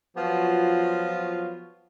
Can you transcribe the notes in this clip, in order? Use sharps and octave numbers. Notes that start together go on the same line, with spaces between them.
F3 F#3 B3 F4 F#4